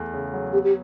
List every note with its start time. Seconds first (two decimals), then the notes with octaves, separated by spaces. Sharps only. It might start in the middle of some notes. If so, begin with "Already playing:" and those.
Already playing: E2 A3
0.14 C#3
0.33 F#3
0.53 B3 G4
0.64 G4